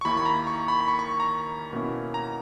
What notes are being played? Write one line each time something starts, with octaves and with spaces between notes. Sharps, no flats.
C#6
D#2 D#3 A#3 E4 B5
B5
A#5
C#6
B5
B5
C#6
C#6
A#5
B2 A#3 C#4 E4
A#5